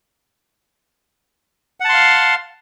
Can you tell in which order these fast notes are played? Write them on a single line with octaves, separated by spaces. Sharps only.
F#5 A5 C6 F5